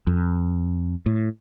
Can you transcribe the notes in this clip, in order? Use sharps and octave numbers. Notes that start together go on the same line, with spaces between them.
F2
A2